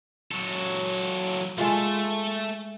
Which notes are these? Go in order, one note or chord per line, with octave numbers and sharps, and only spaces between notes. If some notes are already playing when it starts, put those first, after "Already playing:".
F#3 A4
G#3 A3 F4 A4